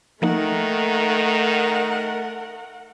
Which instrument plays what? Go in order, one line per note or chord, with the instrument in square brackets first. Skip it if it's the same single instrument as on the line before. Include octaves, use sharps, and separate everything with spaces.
[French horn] D#3 [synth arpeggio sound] F3 A#3 D#4 [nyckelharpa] A3 [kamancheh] A#4 F#5